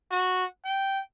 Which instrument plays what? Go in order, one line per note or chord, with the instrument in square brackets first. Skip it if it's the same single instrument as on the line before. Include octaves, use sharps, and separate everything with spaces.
[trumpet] F#4
G5